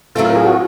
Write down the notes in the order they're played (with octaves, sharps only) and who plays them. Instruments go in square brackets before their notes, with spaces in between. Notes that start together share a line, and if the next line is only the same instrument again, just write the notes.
[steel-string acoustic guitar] A2 F#3 A3 C4 F4 [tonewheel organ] A4
[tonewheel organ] A#4
G#4
F#4